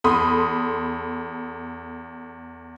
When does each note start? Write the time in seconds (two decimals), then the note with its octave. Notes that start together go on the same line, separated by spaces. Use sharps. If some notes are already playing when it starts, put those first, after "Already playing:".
0.04 E2 A4 B5 C6 D#6